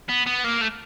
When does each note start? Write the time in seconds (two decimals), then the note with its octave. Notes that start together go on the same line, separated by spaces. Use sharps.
0.09 B3
0.26 B3
0.44 A#3
0.62 A3